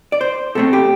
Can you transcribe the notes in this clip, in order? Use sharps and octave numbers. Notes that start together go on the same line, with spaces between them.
D5
C5
B2 A3 C4 A4
G4